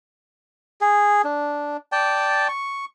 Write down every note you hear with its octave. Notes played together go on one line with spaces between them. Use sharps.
G#4
D4
D5 G5 A5
C#6